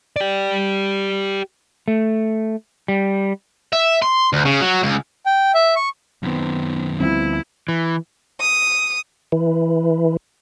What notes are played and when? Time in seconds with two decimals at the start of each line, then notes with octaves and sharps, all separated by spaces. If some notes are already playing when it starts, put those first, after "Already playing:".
0.16 G4 D5
1.88 A3
2.88 G3
3.73 E5
4.02 C6
4.33 D2
4.45 C#3
4.61 F#3
4.83 C#2
5.26 G5
5.54 E5
5.76 C#6
6.23 F#2 D#3 B3 C4
7.00 D2 F3 G3 B3 C4 E4
7.69 E3
8.40 D#6
9.32 E3